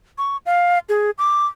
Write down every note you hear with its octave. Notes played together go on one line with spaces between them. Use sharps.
C#6
F5
G#4
D6